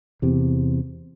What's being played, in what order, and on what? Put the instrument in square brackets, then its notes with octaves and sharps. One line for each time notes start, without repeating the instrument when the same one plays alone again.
[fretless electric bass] E2 C3